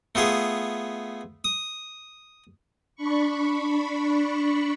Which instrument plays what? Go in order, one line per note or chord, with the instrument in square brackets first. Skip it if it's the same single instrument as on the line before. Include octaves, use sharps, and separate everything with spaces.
[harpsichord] A3 B3 F4 G#4
D#6
[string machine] D4 B5 C#6